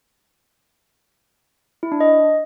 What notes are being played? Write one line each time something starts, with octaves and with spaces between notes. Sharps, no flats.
E4
D4
D#5